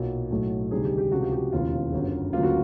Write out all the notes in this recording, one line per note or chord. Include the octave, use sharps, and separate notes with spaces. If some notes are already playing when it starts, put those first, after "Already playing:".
Already playing: B1 A#2 F#3 A#3
B1 A2 F#3 A3
D2 C3 D#3 G3 G#4
G4
G4
C#2 C3 F3 F#4
G4
G4
E1 D#2 C#3 E3 F4
G1 F#2 D3
D2 C#3 F#3 A#3 F4
F#4